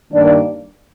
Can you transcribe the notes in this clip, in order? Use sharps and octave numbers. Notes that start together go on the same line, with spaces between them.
G2 D#3 G3 A#3 D4 D5